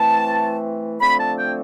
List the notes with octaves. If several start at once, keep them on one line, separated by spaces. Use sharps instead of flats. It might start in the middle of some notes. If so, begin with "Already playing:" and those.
Already playing: E3 A3 C4 A5
D3 F3 A3 C4 B5
A5
G5